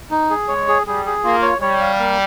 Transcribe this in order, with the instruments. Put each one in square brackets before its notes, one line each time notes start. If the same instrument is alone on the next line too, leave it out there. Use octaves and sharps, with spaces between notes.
[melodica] D#4
G#4
[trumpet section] G#3 [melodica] C#5
[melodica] G#4
[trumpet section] G3 [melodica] G#4
[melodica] G#4
[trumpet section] A#3 [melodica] F4
[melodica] C#5
[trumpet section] G3 [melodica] C#5
[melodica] F5
A#3